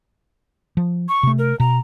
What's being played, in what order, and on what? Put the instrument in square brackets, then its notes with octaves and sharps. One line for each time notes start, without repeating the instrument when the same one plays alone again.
[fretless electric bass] F3
[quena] C#6
[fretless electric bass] C3 A3
[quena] A#4
[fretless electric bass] B2 [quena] A#5